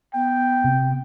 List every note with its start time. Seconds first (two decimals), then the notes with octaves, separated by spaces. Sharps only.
0.14 B3 G5
0.64 C3